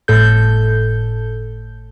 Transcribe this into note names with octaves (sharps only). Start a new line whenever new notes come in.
G1 A2 A4 G6